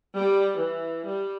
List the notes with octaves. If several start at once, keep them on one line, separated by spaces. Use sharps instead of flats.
G3
E3
G3